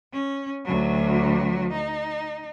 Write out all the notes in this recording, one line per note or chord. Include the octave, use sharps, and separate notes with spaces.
C#4
D2 F#3
D#4